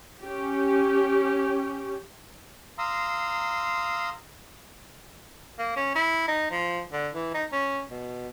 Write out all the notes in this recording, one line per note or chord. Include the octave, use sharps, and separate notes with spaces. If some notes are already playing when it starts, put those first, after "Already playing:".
C#4 G4
F5 A#5 C6 D#6 E6
A#3
C#4
E4
D#4
F3
D3
E3
D#4
C#4
B2